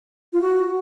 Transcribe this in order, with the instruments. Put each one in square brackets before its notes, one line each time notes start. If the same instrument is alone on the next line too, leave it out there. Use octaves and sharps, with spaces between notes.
[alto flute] F4
F#4